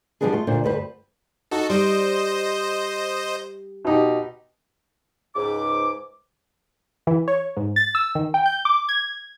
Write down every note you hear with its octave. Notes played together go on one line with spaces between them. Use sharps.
F3 G3 G#3 B3 D4 G#4
A3 F4
D2 A#2 D4 C5
D2 G2 B4 C5
D#4 F#4 A4
G3 C5 D#5
B2 D#4 G4
C#2 G#2 D6
E3
C#5
G#2
A6
E6
D#3
G5
G6
D6
G#6